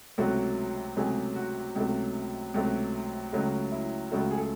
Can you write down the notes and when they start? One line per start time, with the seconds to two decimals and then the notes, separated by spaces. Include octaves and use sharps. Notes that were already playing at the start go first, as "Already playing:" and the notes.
0.18 C#2 C3 F#3 A3 F#4
0.97 C#2 C3 F#3 A3 G#4
1.36 F#4
1.75 C#2 C3 F#3 A3
2.54 C#2 C3 F#3 A3
3.33 C#2 C#3 F#3 A3 F#4
3.72 E4
4.12 C#2 C#3 F#3 A3 F#4
4.31 G#4
4.38 A4